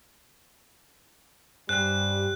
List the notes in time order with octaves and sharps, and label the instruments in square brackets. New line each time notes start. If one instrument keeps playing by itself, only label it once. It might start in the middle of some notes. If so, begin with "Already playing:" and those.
[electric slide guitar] G2 C5 G#5 [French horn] G3 [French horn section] G4 [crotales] F#6